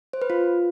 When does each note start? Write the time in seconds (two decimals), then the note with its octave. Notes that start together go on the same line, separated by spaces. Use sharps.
0.13 C5
0.22 B4
0.30 F4